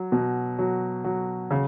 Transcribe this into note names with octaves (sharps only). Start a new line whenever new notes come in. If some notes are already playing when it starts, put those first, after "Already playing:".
Already playing: F#3
B2
F#3
F#3
C#3